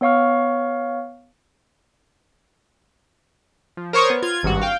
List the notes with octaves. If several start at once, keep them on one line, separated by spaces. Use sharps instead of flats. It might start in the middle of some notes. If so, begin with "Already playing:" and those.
B3 C#5 F5 C#6 F6
F3
A#4 C5 C#5 C#6 D#6
B3
F4 G#6
G#1 G2 F#4
F5 G5